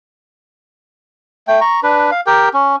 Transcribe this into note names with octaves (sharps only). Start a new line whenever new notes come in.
A3 G5
A#5 C#6
D4 B4
F5
G4 A#4 G5
C#4